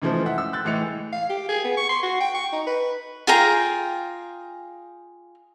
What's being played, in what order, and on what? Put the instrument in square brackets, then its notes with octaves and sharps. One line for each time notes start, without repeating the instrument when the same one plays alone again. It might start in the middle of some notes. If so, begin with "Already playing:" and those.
[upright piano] G#2 C#3 E3 F3 A3 C5
E5 F#5
E6
F#6 G6 A6
A2 E3 G#3 C#7 F7
[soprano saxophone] F5
G4
G#4
B3
C#6
C6
F#4
G5
C#6
D#4
B4
[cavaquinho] F4 G#4 G5 A#5